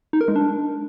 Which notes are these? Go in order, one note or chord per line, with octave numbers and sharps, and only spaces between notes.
D#4
A#4
G#3
D4